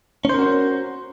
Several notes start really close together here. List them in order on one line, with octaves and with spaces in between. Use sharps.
C#4 C5 A#4 F#4